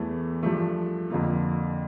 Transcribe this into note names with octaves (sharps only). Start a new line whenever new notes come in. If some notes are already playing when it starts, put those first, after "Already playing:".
Already playing: E2 E3 A3
G2 F3 A3
F2 D3 F3 A#3 F4